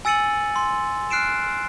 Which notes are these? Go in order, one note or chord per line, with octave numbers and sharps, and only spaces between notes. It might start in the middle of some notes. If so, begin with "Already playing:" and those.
G#5 E6 A6 C#7 D#7 F#7
C6
F6 F#6 C7 D7 E7